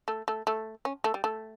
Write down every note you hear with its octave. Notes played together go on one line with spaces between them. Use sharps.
A3
A3
A3
C#4
A3
G3
A3